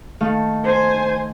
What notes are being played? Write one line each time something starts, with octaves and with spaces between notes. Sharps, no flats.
D#3 A3 F5
C5 G#5